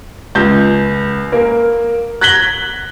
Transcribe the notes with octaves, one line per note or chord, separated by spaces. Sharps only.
C#2 G6
A#3 A#4
F#6 G#6 A#6 B6 F#7 G7